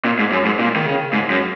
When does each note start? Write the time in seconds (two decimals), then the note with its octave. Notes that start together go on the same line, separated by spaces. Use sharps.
0.05 A#2
0.19 G#2
0.32 F#2
0.45 G#2
0.59 A#2
0.76 D#3
0.86 C#3
1.13 G#2
1.30 F#2